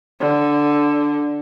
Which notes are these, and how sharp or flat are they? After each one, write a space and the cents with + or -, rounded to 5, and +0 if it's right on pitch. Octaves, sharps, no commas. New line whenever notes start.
D3 +0